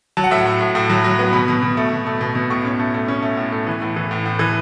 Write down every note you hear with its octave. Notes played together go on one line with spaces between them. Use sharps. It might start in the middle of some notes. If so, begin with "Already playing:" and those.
F#3 A5
F#5
A2 E5
F#5
A2
A2
A2
F#3
F#3
B3
B2 B5
B2
B2
A3
B2
A3
B2
B2
A2 C#6
C#4
A3
A3
C#4
A3
A2
A3
E3
A2
E3
A2
A2
E3